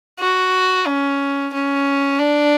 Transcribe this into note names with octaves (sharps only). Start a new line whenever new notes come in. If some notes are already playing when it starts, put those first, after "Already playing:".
F#4
C#4
C#4
D4